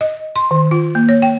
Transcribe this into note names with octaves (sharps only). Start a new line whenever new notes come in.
D#5
C6
D#3
F4
A#3
C#5
G5